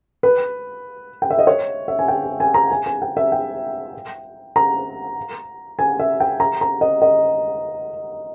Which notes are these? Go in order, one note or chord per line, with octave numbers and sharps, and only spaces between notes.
B4
G5
E5
D#5
C#5
E5
G#5
G5
G#5
G#5
A#5
G#5
G#5
G5
E5
G5
A#5
G#5
E5
G5
A#5
A#5
D#5
D#5